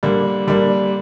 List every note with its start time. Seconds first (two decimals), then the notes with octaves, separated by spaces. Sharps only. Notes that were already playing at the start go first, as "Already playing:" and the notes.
0.03 D3 G3 A#3 D4
0.47 D3 G3 A#3 D4